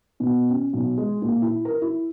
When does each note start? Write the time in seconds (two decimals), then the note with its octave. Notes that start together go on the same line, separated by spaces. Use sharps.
0.20 B2
0.50 C#4
0.73 B1
0.98 G#3
1.22 A#2
1.42 E4
1.65 A#4
1.82 E4